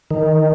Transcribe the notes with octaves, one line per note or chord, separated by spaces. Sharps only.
D#3